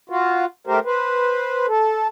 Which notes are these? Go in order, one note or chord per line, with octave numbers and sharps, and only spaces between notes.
F4 F#4
A3 G4 A#4 C5
B4 C5
A4